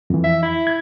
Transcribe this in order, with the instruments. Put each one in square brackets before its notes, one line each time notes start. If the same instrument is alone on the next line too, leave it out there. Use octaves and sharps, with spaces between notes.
[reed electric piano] F2 E3
[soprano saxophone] E5
E4
[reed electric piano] G#6